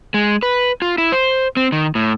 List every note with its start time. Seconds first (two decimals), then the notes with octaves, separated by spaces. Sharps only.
0.14 G#3
0.43 B4
0.82 F4
0.98 E4
1.12 C5
1.57 C4
1.72 D#3
1.95 A2